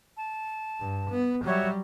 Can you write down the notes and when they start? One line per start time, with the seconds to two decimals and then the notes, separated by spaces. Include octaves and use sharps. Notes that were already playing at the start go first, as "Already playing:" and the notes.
0.16 A5
0.80 G2
1.11 B3
1.44 F#3 G3 F#4 C#5 E5